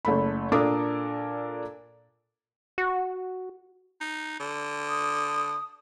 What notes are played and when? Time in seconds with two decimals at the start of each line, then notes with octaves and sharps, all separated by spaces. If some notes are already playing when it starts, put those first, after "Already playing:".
0.05 F#1 A3 B5
0.52 A#2 D4 A4 A#4 D6 D#6
2.78 F#4
4.01 D#4
4.40 D3
4.88 D#6